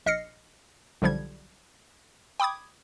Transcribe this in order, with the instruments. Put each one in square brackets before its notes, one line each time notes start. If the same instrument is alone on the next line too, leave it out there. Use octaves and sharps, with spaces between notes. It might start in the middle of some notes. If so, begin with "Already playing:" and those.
[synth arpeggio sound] A#1 D#5 F6 A#6 C7 C#7
B1 D3 F3 G3 G#6
G5 B5 D6 D#6 G#6